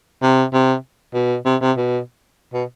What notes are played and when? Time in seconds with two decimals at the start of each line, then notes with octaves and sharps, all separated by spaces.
0.22 C3
0.53 C3
1.14 B2
1.45 C3
1.61 C3
1.77 B2
2.53 B2